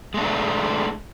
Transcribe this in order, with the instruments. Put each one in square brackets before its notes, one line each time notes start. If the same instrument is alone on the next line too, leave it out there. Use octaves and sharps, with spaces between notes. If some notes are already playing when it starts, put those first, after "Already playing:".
[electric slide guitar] G#3 A3 D4